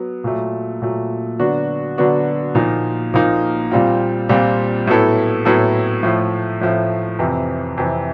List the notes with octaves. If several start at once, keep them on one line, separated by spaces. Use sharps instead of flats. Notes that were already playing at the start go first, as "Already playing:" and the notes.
Already playing: F#3 B3
A#2 F#3 A3
A#2 F#3 A3
D3 F#3 B3 D4 F#4
D3 F#3 B3 D4 F#4
A#2 F3 A#3 D#4
A#2 F3 A#3 D#4
A#2 G3 C4 F4
A#2 G3 C4 F4
A2 F#3 B3 E4 A4
A2 F#3 B3 E4 A4
A2 F3 A3
A2 F3 A3
F2 C3 E3
F2 C3 E3